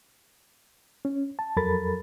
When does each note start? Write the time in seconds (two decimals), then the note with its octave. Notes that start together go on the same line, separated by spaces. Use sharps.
1.05 C#4
1.39 A5
1.57 F2 F#3 A4 A#4 B5 A6